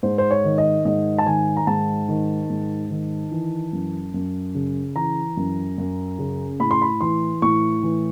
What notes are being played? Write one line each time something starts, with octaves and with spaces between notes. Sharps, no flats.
G#2 C5
C5
C#5
D#3
D#5
G#2 D#5
A5
D#3 G#5
A#5
G#2 A5
D#3
G#2
D#3
E3
F#2
F#2
C#3
E3 A#5
F#2
F#2
C#3
A2 B5
C6
B5
E3 C6
A2 C#6
E3